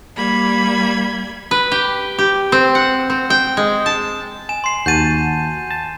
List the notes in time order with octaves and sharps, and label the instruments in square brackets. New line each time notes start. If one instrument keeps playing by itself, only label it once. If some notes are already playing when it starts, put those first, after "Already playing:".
[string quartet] G3 A#3 B5 G#6
[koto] B4
G4
G4
C4
F#5
C4
G5
G#3
A5
[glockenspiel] G#5 E7
C6 C7
[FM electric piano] D#2 F#4 A5 [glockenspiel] G6 D#7 E7
[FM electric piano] A5